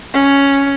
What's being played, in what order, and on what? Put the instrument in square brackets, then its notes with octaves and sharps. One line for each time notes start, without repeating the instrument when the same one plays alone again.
[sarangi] C#4